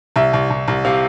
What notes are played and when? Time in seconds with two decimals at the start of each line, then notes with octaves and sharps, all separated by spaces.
0.16 C2 E5
0.33 C2
0.50 C2
0.68 C2
0.85 C3 F5